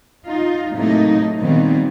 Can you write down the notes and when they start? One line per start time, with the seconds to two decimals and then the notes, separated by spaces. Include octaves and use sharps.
0.25 D#4 F4
0.73 A2 C3 F#3 A3 A#3 D#4
1.39 A#2 D#3 G3 B3 C4